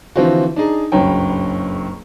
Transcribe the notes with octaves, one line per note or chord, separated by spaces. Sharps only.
D3 E3 F3 C4 F4 F#4
D4 D#4 G#4
F#1 C#2 G2 F#3 G5